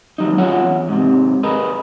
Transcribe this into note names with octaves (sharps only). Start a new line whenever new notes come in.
D#2 F#3 D#4
C#4 F4 F#4 G#4 C#5 F#5
E2
G#2 C3
G#4 A#4 B4 D#5